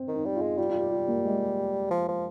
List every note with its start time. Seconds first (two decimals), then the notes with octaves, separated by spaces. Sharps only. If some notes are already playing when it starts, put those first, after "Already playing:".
Already playing: C4
0.08 D#3
0.14 D#4
0.25 G3
0.36 F4
0.42 G#3
0.58 G3 F4
0.69 F4
0.75 G4
0.91 F4
1.08 A#3
1.25 G#3
1.91 F3
2.09 F3